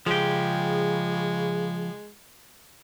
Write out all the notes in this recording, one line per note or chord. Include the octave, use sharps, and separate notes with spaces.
C#3 F3 G#3 G4